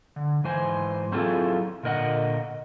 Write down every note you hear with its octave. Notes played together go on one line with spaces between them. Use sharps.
D3
G#2 E3 C5 G#5
F#3 C4 E4 F4 G#4 A4
A#2 D3 A#4 D#5 F#5